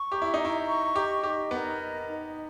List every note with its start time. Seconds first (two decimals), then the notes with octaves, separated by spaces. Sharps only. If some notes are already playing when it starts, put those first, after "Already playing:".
Already playing: C#6
0.11 G4 A#5
0.22 E4
0.34 D#4
0.40 A#5
0.45 E4
0.67 C#6
0.95 G4 D#5
1.23 D#4 G4
1.51 B3 A#4
1.79 D#5
2.07 D#4